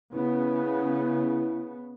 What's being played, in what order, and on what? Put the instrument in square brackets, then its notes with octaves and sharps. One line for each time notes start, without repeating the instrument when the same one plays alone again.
[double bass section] C#3 B3 [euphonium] E4